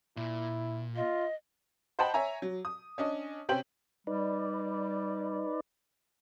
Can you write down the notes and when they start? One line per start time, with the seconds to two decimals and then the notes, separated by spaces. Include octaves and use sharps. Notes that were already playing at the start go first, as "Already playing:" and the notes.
0.17 A#2 E4
0.96 F4 D#5
1.99 C5 D#5 F#5 G5 A5 B5
2.14 C#5 E5 G#5 A#5
2.42 F#3
2.65 D#6
2.98 C#4 D4 D#5
3.49 C3 C#4 G4 C5 G5 F#7
4.07 G3 D#4 B4 D5